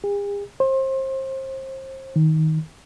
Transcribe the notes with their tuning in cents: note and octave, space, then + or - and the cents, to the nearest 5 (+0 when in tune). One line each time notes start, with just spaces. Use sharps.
G#4 -45
C5 +30
D#3 +20